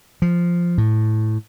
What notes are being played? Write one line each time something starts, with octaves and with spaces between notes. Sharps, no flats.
F3
A2